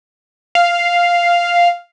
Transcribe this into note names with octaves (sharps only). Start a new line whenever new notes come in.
F5